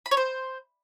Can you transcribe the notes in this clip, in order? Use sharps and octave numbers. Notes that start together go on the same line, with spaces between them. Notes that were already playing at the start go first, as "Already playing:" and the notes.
B5
C#5
C5